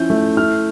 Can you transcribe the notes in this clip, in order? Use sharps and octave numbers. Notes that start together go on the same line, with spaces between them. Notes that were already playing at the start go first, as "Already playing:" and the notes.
Already playing: F3 C#4 E4 G6
A3
E4 F6